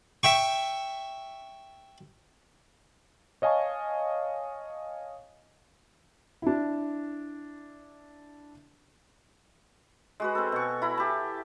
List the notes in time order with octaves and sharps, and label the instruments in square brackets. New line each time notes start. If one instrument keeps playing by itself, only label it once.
[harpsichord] E5 G5 C#6
[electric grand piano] C#5 D#5 F5 G#5 A5 C#6
[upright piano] D4 E4
[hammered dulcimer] G#3 F#4 B4
C4 A4
B2 C#6
E4 A#5 B5
G4 A5